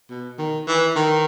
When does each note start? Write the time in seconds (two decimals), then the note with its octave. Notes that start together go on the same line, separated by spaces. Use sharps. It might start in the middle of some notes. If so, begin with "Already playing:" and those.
0.10 B2
0.39 D#3
0.68 E3
0.96 D#3